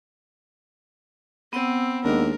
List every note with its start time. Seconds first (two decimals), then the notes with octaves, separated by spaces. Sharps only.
1.53 B3 C4 F#5 E6
2.05 D#2 G#3 D4 A#4